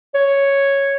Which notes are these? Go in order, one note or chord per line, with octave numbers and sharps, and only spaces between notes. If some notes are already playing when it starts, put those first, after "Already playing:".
C#5